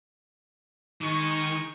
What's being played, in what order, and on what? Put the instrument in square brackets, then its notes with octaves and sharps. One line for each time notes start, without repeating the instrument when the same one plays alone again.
[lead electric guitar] D#3 [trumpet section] G#3 D#4 C#6